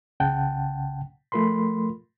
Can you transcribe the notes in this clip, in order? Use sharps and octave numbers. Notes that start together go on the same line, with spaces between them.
C2 C#3 F#5 G5 A5
F3 A3 F4 A#4 B5 C6